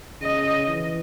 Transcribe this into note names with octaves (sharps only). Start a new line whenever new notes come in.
C#3 D#5
E3